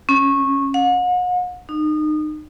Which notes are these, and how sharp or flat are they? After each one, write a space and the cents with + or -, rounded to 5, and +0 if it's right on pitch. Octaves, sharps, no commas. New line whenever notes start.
C#4 -15
F#5 -40
D#4 -30